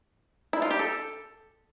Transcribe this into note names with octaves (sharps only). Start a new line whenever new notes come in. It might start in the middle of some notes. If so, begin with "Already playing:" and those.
E4
F4
G4
A4